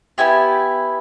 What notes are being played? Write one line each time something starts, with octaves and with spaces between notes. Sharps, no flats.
B3 E4 G4 G#5